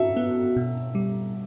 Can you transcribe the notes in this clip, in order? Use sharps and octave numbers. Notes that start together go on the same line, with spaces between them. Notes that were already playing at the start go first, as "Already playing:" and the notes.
Already playing: F#4 E5
B3
B2
G3